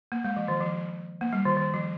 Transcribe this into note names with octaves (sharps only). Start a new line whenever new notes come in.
A#3
G#3
F3
D#3
F3
A#3
G3
D#3
D#3
F3